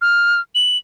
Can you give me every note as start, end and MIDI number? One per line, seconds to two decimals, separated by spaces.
0.01 0.40 89
0.55 0.78 102